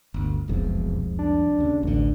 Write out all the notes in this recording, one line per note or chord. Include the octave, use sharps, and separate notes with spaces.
G1 D2
E1 C2 F2 G#2
D4
D#2 C#3
A1 D2 D3